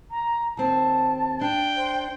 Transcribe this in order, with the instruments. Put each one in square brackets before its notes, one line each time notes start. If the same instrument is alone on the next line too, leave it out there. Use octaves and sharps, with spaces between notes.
[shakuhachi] A#5
[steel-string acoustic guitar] D#2 C4 [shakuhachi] A5
[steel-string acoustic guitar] D4 [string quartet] G5
[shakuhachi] C5